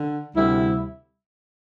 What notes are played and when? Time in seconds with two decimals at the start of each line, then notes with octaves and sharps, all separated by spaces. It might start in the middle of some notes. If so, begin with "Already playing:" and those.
Already playing: D3
0.35 D2 C3 G3 E4